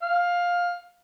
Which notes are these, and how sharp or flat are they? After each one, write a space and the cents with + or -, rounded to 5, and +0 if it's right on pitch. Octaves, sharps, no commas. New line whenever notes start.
F5 +10